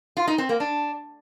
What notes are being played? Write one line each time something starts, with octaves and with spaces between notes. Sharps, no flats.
F4
D#4
C4
A#3
D4